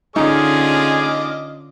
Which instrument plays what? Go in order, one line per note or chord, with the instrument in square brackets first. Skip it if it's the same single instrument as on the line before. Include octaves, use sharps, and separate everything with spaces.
[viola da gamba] D3 C#4 F4 [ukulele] D#4 [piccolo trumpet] G#4 [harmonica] D#5 D6 F6